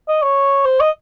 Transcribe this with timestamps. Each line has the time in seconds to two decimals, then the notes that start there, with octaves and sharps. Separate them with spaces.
0.08 D#5
0.22 C#5
0.65 C5
0.80 D#5